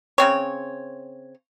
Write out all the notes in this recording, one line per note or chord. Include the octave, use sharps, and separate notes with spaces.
C#3 C4 C#5